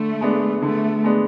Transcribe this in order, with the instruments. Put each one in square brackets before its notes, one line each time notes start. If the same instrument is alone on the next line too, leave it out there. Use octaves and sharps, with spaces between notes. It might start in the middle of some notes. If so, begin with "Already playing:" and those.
Already playing: [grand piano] D3 [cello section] A3
[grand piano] G#3 B3 D4
[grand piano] D3 [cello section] A3
[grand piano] G#3 B3 D4